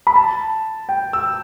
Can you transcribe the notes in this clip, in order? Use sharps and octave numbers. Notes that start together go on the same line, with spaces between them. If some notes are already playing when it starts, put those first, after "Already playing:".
B5
A5
G5
E6